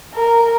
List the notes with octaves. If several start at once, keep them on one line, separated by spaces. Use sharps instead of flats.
A#4